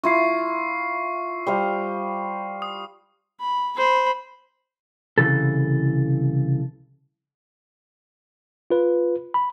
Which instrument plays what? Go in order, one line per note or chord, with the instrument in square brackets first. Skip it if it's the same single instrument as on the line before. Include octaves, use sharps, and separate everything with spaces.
[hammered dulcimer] E4 F4 [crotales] C#6 C7
[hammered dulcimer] G3 C5 F5
[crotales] D#6
[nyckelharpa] B5
C5 B5
[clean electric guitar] C2 C#3 E3 A4
[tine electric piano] F4 B4
B5